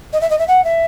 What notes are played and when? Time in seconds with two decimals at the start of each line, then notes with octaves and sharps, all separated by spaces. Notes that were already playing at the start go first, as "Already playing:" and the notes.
0.12 D#5
0.21 E5
0.30 D#5
0.38 E5
0.47 F#5
0.64 E5